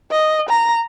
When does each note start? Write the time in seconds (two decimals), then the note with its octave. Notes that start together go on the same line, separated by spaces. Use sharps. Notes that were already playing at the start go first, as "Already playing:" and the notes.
0.11 D#5
0.49 A#5